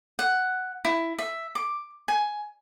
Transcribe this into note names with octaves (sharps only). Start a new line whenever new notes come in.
F#5
E4
E5
D6
G#5